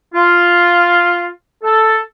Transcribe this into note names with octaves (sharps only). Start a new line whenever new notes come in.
F4
A4